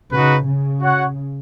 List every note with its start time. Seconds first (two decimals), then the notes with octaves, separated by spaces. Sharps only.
0.13 C#3 D#4 F#4 B4
0.46 C#3
0.80 F#4 C#5 F#5